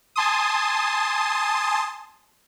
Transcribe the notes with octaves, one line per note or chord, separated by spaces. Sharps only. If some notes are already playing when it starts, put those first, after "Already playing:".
G#5 A5 C6 D#6